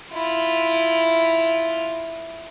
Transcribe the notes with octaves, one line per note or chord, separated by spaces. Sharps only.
E4 F4